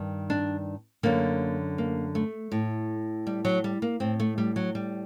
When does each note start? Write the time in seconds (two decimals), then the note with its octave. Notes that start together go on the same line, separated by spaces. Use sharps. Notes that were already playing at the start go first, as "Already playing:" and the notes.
Already playing: G2 D#3
0.30 D4
1.03 F#2 D3 A#3
1.78 A#3
2.15 A3
2.52 A2
3.27 G3
3.45 F#3
3.64 G3
3.82 A#3
4.00 A2 C4
4.20 A3
4.38 G3
4.56 F#3
4.75 G3